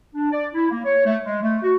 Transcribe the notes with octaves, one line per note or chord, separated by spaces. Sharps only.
D4
D5
E4
A#3
C#5
A3
G#3
A3
F#4